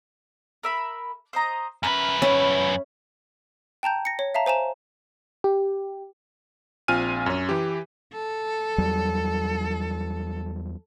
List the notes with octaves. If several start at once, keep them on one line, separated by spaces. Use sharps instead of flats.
A#4 E5 B5
C5 D#5 A#5
F#2 C#4 E4 A#4 B4
C#4 E4
G5 A5 A#5 G6
A#6 C#7
C#5
E5 F5 A5 A#5
C5 G#5 A#5 E7
G4
A#1 C4 F4 G#5 F6 D#7
F#2 C#4
E3 G4
A4
E2 F#3 G3